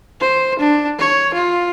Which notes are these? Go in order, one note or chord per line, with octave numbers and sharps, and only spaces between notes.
C5
D4
C#5
F4